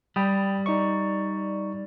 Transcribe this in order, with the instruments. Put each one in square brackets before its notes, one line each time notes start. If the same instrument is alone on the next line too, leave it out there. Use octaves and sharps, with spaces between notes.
[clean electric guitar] G3 [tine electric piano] G5 B5 D#6
[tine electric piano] D#4 D5 C#6